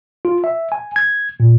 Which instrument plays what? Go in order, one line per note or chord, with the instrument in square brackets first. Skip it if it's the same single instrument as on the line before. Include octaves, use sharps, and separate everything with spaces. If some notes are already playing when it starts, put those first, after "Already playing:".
[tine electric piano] F4
E5
G#5
G#6
A#2